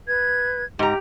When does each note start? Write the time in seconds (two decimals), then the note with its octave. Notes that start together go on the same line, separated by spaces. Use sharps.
0.08 B4 G#6
0.79 G#2 G4 A#5